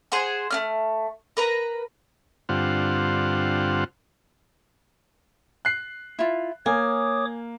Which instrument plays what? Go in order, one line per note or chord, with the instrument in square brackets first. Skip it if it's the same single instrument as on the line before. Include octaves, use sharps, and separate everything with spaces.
[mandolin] G#4 C5 F#5 G#5
A3 B3 F6
A#4 B4 A#5
[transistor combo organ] G2 D3 C4 F4 F#5
[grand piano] F#6 C7
[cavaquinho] E4 F4
[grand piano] A#3 [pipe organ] C#5 D6 D#6 [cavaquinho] G#5